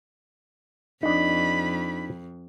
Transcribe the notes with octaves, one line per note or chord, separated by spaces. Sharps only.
F2 D4 D#4 B5